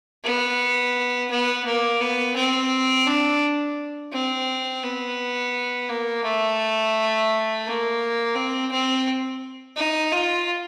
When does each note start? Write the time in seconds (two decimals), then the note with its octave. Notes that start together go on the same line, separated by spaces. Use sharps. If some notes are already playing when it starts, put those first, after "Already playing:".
0.24 B3
1.31 B3
1.65 A#3
2.01 B3
2.36 C4
3.07 D4
4.13 C4
4.83 B3
5.89 A#3
6.24 A3
7.66 A#3
8.36 C4
8.71 C4
9.77 D#4
10.12 F4